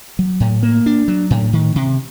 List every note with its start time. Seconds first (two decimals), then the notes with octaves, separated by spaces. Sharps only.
0.19 F#3
0.40 A2
0.63 A#3
0.86 D4
1.08 F#3
1.30 A2
1.53 D#3
1.76 C3